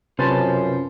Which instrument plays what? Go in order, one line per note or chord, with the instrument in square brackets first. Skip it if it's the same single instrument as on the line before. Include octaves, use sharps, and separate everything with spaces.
[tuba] F#2 [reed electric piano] C3 B4 A6 [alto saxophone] F3 [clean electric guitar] C#4 C5 A5